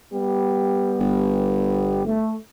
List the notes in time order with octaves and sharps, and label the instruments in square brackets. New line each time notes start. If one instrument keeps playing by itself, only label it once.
[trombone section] G3 B3 G4
[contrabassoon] G1
[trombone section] A3